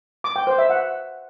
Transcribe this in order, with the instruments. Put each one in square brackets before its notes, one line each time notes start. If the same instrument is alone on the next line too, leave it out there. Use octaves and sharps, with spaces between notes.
[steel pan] D6
G5
C5
E5
F#5